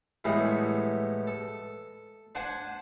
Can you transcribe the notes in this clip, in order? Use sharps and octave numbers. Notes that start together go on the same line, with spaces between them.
A2 E3 G3 G#3 B3
A4
D4 C5 F#5 G#5 A5